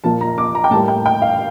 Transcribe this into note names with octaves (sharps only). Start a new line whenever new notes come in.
A#2 F3 A#3 A5
A#5
D6
A#5
G5
A2 G3 A#3 A5
G5
G5
F5